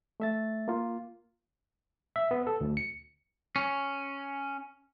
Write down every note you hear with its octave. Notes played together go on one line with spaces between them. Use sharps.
A3 E5 A6
A#3 F4
E5
B3
A4
D2
C#7
C#4